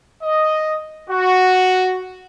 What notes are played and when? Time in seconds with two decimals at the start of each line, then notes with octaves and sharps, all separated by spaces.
0.23 D#5
1.09 F#4